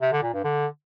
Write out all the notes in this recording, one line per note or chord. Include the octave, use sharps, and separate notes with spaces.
C3
D3
A#2
G2
D3